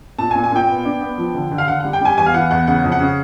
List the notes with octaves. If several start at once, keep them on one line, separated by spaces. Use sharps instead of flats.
A#2 A5
G#5
A#2
G#5
A#2 G5
B3
D4
B3
F3
D3
D3
F5
D3 F#5
G3 F#5
G5
G3 G#5
E2 G#5
F5
E3 F#5
E2 F#5
C#3 F#5
F2
F#5
C#3